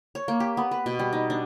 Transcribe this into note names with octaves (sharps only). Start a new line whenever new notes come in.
C#5
A#3
G4
B3
B4
B2
G3
D#4
D4